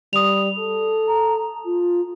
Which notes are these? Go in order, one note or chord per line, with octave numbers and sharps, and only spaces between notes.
G3 D#6 F7
A4
A#5
F4